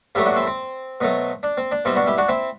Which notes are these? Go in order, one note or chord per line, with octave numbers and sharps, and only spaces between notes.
G2 F#3 A3 E4 G4
D4 F#4
C4 E4
C4
B2 F#3 A3
D4
C4
D4
B2 G3 C4 E4
D4 F#4
E4 G4
D4 F#4
C4 E4